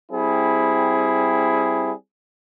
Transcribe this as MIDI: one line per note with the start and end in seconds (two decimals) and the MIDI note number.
0.12 1.92 55
0.12 1.92 60
0.12 1.92 64
0.12 1.92 68